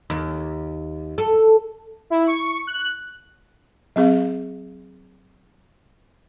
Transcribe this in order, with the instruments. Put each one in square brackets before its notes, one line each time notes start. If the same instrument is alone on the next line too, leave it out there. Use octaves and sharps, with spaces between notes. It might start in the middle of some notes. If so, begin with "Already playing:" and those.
[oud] D#2
A4
[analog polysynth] E4
C#6
F#6
[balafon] F#3 C4 G#4 F5